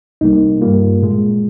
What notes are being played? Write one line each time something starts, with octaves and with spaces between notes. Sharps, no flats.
C2 C3 G3 A#3 D#4
G2 G3 A#3 F4
A#2 G#3